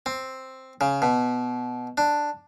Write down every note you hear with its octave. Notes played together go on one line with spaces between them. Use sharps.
C4
C#3
B2
D4